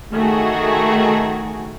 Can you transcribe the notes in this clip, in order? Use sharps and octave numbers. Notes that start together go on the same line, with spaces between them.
D#3 A3 F#4 G#4